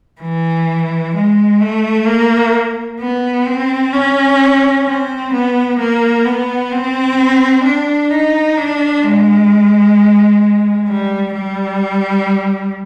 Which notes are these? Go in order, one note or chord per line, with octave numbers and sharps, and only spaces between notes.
E3
G#3
A3
A#3
B3
C4
C#4
C4
B3
A#3
B3
C4
D4
D#4
D4
G#3
G3
G3